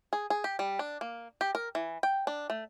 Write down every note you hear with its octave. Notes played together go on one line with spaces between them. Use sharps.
G#4
G#4
G4
G3
D4
A#3
G4
A#4
E3
G5
D4
A3